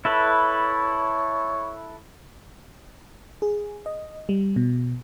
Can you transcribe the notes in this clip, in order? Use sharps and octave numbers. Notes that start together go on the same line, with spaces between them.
E4 A4 B4 C#5
G#4
D#5
G3
B2